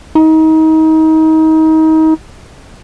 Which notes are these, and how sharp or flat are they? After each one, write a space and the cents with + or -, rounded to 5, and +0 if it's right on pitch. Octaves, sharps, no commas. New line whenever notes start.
D#4 +30